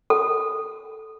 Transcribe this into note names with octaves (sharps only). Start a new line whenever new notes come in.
A4